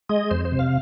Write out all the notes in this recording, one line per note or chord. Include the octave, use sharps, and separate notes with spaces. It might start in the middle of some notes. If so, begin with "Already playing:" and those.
G#3 D#5
F2 C5
C5
C3
F5